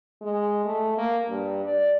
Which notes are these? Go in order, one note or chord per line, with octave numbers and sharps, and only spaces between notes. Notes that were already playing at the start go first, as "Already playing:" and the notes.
G#3
A3
A#3
G2
D5